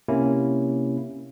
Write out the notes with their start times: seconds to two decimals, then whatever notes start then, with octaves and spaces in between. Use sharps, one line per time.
0.08 C3 A#3 C#4 E4